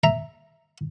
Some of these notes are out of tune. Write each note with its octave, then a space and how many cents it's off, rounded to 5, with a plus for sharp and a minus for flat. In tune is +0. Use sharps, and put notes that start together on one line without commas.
E5 +0 A#5 +0